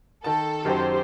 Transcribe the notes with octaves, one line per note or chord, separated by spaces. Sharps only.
D#3 A4 A5
F#2 D#3 F#3 G4 C5